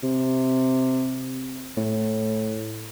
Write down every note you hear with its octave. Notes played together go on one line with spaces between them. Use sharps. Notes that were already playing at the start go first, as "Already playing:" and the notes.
C3
A2